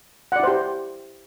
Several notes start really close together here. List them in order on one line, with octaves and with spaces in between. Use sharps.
F#5 D5 E4 C5 G4